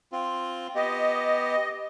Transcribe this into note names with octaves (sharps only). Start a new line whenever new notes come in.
C4 F4
B3 G4 D#5